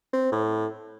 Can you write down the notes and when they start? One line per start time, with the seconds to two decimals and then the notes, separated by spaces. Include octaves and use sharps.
0.13 C4
0.32 A2